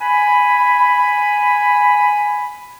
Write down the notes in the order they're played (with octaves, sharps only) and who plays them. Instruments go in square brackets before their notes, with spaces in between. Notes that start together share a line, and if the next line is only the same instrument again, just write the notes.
[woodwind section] G#5 B5